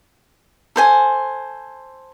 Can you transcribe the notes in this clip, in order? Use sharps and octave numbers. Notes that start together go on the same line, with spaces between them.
A4 C5 G#5